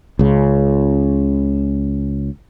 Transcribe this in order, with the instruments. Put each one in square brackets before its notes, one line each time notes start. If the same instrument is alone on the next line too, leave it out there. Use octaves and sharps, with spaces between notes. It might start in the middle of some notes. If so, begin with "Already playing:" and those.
[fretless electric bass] C#2 C#3